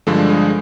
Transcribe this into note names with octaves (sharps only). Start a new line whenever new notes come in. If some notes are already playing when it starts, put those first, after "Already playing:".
G2 D3 F3 G#3 A4
G#4